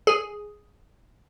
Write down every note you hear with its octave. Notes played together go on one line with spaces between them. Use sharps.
G#4